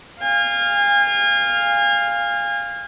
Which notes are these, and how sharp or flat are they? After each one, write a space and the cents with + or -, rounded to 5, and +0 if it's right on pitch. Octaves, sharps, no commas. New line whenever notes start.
F5 +0 G#5 -35